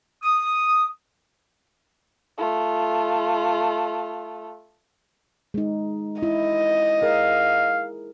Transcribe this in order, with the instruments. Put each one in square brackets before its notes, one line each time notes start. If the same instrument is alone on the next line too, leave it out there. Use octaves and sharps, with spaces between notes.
[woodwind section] D#6
[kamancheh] A3 F4
[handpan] G#3 D#4
[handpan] E4 [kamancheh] D#5
[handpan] G#4 A#4 [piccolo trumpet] F5